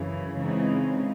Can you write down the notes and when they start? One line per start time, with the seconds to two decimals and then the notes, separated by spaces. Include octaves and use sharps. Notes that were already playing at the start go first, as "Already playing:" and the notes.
Already playing: F#2 C#3 E3
0.37 C#3 E3 G#3 C4 D#4